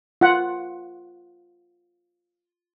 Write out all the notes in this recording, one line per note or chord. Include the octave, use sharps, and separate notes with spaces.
F4 F#5